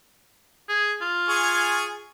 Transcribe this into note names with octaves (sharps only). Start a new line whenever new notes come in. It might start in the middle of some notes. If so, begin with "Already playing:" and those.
G#4
F4
G#4 G#5 C#6